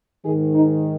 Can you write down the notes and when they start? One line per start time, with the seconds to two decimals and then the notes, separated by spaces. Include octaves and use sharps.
0.24 G#2 D#3 G#4
0.54 D#4